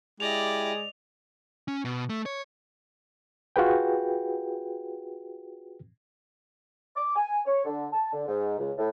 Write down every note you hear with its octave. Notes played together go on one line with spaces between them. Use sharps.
G#3 E4 G4 D5 D#5 F7
C#4
B2
A3
C#5
F4 F#4 G#4 B4 G5
D6
G#5
C#5
D3
A5
D3
G#2
C#2
A2